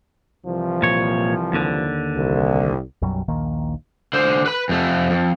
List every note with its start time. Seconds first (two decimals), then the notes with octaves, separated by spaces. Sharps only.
0.46 C2 E3 F3
0.82 A#2 C#5
1.53 D#2 D3
2.17 C2
3.02 B1 F#2 F#3 G3
3.28 A#1 D#2 D#3 A#3
4.13 D3 C5
4.46 B4 B5
4.69 F2 A3
5.10 F2